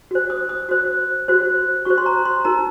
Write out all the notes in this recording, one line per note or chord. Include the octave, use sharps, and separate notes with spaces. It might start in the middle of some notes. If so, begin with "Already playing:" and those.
F#4 C5
D#6
D#6
F#4 C5
F#4 C5
F#4 C5 C#6
C6
A#5
C6
D#4 F#4 A#4 A#5